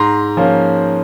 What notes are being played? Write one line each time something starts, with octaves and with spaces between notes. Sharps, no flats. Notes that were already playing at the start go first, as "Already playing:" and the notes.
Already playing: G#2 A#5 C6
F3 A#3 C#4